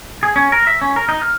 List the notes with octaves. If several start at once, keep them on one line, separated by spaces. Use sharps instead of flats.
G#4
C#4
A#4
E5
C#4
A#4
D#4
F6